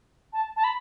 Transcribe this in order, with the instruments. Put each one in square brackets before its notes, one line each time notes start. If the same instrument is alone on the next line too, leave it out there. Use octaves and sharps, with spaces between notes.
[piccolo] A5
A5
B5